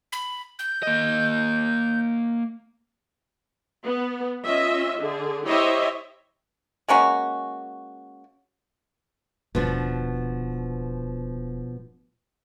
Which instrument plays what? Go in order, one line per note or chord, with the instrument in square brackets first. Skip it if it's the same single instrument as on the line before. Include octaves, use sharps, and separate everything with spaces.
[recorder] B5
G6
[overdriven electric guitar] A#3 D#5
[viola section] B3
C#4 F4 D#5 E5
D3 G#4
E4 G4 C5 C#5 D#5 E5
[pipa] G#3 A#3 C#4 F#4
[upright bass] D#1 [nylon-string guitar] B2 F3 D4